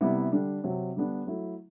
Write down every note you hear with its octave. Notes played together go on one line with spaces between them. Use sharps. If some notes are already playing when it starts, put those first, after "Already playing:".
C3 G3 B3 E4
D3 G3 D4
C3 F#3 C4
D3 G3 B3 D4
F#3 A3 E4